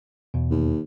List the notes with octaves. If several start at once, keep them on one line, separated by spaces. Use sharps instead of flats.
E2 B2
D#2